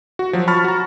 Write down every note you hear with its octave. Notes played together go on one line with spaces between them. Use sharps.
F#4
F3 F#3
A5 B5 C#6 F6 A6
F#4 A#5